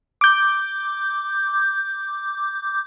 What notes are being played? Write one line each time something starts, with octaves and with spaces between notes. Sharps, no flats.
D6 G6